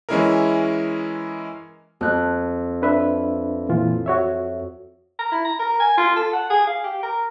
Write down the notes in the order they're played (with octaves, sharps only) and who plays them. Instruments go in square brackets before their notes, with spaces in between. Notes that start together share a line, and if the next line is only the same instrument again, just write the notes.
[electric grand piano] E3 G#3 C#4 E4 G#4 A#4
[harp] F2 F#6
[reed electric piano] D4 B4 E5
A#2 E3 F4
F#4 C#5 E5
[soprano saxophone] A#5
E4
A#5
A#4
G#5
F4
A4
F#5
G#4
F5
G4
A#4